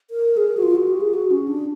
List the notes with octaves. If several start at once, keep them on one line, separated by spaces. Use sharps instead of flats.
A#4
G#4
F#4
F4
F#4
G4
G#4
F#4
C#4
D4